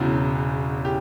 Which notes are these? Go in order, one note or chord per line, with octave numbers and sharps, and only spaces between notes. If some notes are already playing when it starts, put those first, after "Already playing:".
Already playing: E1 E2 C#3 F#4
G4